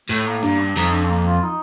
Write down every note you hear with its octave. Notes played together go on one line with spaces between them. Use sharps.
A2 A3
A#3
G2 A#3
D4
F2 D#4
D4
C4
A#3
F4
D#4